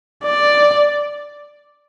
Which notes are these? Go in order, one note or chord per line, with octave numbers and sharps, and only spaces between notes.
D5